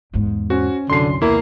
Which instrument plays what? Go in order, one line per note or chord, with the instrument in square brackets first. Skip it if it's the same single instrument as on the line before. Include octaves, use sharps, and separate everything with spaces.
[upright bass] E2 G#2
[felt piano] C#4 C5 [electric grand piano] F#4
[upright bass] C2 [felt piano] F#2 [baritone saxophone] D3 [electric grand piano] C6 C7
[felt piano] E2 [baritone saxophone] A#3 [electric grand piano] E4